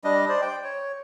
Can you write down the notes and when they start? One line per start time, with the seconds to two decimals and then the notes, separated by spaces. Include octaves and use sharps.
0.04 G3 D4 D#5
0.29 C5 D5
0.42 G5
0.64 C#5